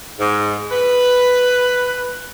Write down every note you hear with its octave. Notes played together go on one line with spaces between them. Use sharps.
G#2
B4